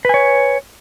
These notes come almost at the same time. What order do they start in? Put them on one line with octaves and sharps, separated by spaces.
B4 G#5 C#5